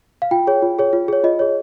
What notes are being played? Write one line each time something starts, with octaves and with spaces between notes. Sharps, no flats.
F5
F4 G5
G#4 C#5
F4
G#4 C#5
F4
G#4 C#5
F4 D#5
G#4 C#5